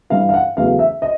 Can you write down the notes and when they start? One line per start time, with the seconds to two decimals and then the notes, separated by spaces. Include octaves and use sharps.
0.10 G2 E3 G3 F5
0.29 F5
0.34 F#5
0.57 E2 C#3 F#3 A3 F5
0.79 E5
1.02 D#5